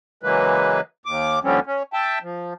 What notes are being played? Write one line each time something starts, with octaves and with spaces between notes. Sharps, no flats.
C#3 E3 F#3 G#3 A#3 B4
D#2 D6
D#2 D3 F3 G3 C4 C#4
C#4
E5 G5 A5
F3